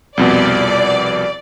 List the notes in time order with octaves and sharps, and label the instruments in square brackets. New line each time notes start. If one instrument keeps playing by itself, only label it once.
[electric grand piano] C2 F2 B2 [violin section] D5